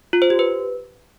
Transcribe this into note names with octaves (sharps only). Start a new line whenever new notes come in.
F4
C5
G4
B4